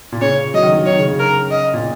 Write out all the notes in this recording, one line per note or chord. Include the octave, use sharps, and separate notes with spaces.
A#2
C#3 C#5
F#3 D#5
D#3
F#3
D#3 C#5
C#3
C#3
A#4
D#5
A#2